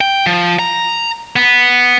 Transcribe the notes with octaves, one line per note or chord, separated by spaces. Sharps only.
G5
F3
A#5
B3